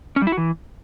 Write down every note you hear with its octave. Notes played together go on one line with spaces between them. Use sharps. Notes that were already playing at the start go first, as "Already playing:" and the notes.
C#4
G3
E4
F#4
E3